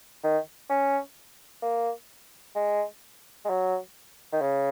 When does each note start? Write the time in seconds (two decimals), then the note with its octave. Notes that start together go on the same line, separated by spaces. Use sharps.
0.24 D#3
0.70 C#4
1.62 A#3
2.55 G#3
3.45 G#3
3.49 F#3
4.33 D#3
4.41 C#3